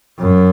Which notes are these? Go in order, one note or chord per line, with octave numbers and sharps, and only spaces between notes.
F#2